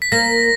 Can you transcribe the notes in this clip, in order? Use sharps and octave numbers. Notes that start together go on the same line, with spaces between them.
B6
A#3 A#6